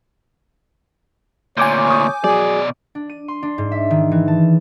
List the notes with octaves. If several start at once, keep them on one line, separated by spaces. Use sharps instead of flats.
D2 A#2 C#5 G#5 D6 G6
C#6 D#6
B2 F#3 G#4 D5
D4
D#7
C6
D4
G#2
E5
D#3
E3
A5